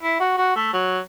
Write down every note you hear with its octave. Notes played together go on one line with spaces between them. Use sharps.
E4
F#4
F#4
A3
F#3